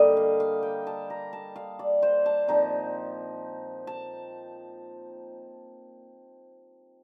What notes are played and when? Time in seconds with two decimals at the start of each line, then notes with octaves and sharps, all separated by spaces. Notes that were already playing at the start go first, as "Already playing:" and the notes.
Already playing: D3 G3 A#3 D#5
0.17 F5
0.40 F5
0.63 G5
0.87 A5
1.10 A#5
1.33 A5
1.56 F5
1.79 D5
2.02 C5
2.26 A5
2.48 A#2 F3 C4 D#4 A#5
3.87 A5